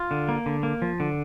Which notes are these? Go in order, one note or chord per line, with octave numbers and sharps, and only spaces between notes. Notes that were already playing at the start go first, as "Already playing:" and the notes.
Already playing: F4
D3
A#3
D3
A#3
F3
D3